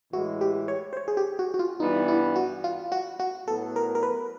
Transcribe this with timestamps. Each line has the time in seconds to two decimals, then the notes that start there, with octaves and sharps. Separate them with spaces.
0.13 A2 E3 G#3 F#4
0.41 G4
0.68 C#5
0.93 C5
0.97 C#5
1.08 G#4
1.17 G4
1.39 F#4
1.54 F#4
1.59 F4
1.80 G2 E3 G3 B3 D#4
2.08 E4
2.36 F#4
2.64 F4
2.92 F#4
3.20 F#4
3.48 A2 F#3 B3 A4
3.76 A#4
3.95 A#4
4.03 B4